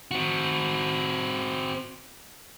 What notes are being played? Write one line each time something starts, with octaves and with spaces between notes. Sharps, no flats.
C4 F#4